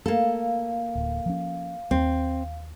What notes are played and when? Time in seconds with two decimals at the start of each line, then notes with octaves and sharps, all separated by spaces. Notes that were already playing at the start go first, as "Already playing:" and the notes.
0.06 A3 A#3 A4 F5
0.95 D1
1.26 F3 C#4
1.91 D#2 C4